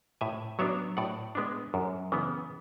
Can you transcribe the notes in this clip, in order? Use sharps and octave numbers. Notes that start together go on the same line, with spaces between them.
A2 E5 G#5
F#3 B3 D4 C#5 E5
A2 D5 F#5
G#3 B3 D4
F#2
C#3 E3 B3